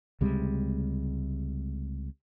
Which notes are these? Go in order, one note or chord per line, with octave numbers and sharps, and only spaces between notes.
C#2 C3 G3 G#3